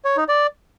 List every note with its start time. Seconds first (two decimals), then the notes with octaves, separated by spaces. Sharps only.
0.05 C#5
0.17 D#4
0.29 D5